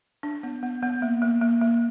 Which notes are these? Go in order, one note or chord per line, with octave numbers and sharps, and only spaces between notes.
D4
B3
B3
B3
A#3
A#3
A#3
A#3